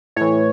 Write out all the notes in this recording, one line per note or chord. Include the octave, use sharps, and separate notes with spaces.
A2 E3 C#5